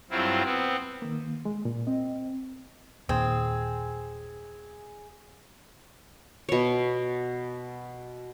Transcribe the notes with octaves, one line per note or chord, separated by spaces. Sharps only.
G2 F#3 C4 E4 F4
B3 C4
D#3 A#3
G#3
A#2
C4 D#5
D#2 A#2 D#3 C4 G#4
B2 C#5